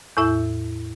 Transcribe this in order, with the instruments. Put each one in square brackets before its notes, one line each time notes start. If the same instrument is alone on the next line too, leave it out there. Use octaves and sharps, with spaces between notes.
[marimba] E2 A2 E4 E5